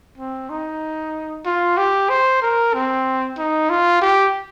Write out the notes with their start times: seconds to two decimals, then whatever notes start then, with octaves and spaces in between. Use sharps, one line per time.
0.18 C4
0.50 D#4
1.46 F4
1.78 G4
2.10 C5
2.42 A#4
2.74 C4
3.38 D#4
3.70 F4
4.02 G4